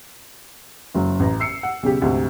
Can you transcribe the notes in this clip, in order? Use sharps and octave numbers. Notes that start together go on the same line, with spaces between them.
F#1 F#3
A1 A#5
E6 C7 C#7
F#5
B1 C#3 G4
D2 G#2 C3